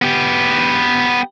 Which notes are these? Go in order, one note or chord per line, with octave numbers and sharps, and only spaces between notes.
B3 G4